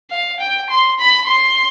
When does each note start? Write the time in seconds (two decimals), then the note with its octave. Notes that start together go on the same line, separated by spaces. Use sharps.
0.10 F5
0.40 G5
0.69 C6
0.99 B5
1.27 C6